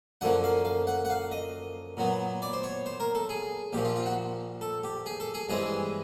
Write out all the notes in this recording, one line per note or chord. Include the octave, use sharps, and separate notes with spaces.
F#2 D3 F3 A#3 F#5
F5
F5
F#5
F#5
F5
D#5
A#2 F#3 B3
D5
C5
C#5
C5
A#4
A4
G#4
A#1 A#2 F3 G4
F4
F4
F#4
A4
G4
G#4
A4
G#4
G2 E3 G#3 C4 G#4